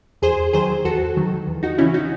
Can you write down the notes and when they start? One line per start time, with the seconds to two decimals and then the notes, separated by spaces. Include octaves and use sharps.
0.22 E2 G#4 C5
0.53 D#3 F#3 G#4 C5
0.85 E2 F#4 A4
1.17 D#3 F#3
1.47 E2
1.63 D#4 F#4
1.78 C#3 E3 C#4 E4
1.94 D#4 F#4